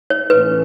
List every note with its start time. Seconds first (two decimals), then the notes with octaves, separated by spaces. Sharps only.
0.10 C#5
0.30 A2 E3 A3 C#4 B4